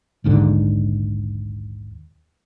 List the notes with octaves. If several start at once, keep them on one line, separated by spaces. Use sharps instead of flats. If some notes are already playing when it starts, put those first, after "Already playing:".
A#1 D#2 G#2 D3